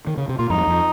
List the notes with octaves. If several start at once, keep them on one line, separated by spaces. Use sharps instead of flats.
D#3
C#3
C3
A#2 F4
F2 G#2 D#4
F2